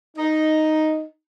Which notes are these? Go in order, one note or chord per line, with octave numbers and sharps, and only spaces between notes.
D#4